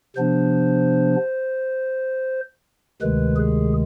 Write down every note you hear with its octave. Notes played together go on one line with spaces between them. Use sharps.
C3 F3 B3 D4 C5
D2 C3 D#3 G#3 B4
G#4